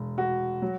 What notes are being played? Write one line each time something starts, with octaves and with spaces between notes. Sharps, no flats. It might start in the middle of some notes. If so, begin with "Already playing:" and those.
Already playing: E1
F#4
F#3